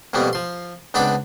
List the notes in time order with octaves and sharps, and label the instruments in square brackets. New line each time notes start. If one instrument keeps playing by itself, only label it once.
[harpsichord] F2 B2 G3 A#3 B3
F3 C6
C#2 B3 C4 D4 B5 D6